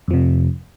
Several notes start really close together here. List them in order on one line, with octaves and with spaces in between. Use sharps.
F2 F3 C3